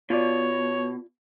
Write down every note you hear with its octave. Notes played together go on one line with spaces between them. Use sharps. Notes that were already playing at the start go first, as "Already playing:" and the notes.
B2 F4 C#5 D5